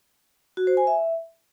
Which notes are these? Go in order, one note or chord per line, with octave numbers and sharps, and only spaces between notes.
F#4
C5
G#5
E5